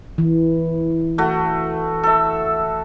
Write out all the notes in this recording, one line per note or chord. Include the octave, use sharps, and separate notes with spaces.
E3
A3 F#4
A4 E5